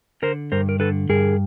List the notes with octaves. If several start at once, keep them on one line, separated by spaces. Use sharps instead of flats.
D3 A#4 C5
G2 A#4 C5
A#4
D3 A4 B4
G2 G#4 A#4